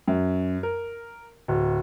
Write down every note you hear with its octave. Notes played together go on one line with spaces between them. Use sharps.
F#2
A#4
D1